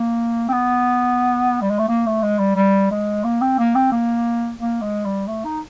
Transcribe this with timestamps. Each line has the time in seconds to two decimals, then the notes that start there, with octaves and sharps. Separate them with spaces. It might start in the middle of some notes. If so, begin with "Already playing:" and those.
Already playing: A#3
0.49 C4
0.53 B3
1.61 G3
1.70 G#3
1.79 A3
1.89 A#3
2.06 A3
2.22 G#3
2.39 G3
2.56 G3
2.91 G#3
3.24 A#3
3.41 C4
3.59 A#3
3.75 C4
3.92 A#3
4.59 A#3
4.82 G#3
5.05 G3
5.27 A3
5.45 D#4